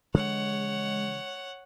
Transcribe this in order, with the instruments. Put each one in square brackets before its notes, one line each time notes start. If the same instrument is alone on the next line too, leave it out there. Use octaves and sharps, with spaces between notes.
[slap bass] C#3 E3 F3 [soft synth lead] G#3 [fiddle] C#5 F#5